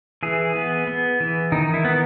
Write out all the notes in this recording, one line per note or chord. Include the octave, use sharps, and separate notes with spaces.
E3 G#4
B3
B3
E3
D#3 D#4
E4
B3